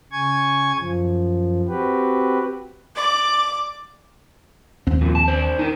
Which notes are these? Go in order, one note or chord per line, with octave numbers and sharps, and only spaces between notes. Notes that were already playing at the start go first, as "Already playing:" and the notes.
C#3 G#5 C#6 G#6
F#2 F3
C4 F#4 G4 B4
D5 D6
D#2 C4
F2 A#2
A5
D4 C5
D#4 A#4